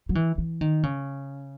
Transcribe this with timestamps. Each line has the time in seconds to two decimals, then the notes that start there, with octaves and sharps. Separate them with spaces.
0.09 F#3
0.15 E3
0.38 E3
0.61 D#3
0.83 C#3